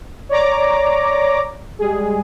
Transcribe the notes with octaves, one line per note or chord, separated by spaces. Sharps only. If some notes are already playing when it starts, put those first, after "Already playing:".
C#5 D5 A#5 D6
G3 G#3 G#4